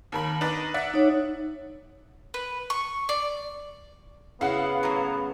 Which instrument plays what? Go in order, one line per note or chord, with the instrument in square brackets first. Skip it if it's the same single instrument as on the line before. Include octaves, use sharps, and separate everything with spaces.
[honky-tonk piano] D#2 A#4 B5
D4 D#4 B4
D5 E5 F#5
[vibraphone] D#4 C#5
[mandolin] B4
C#6
D5
[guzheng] C#3 F#4 [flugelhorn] B3 [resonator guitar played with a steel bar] E4 [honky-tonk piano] F5 F#5
[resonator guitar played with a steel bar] A2 F#3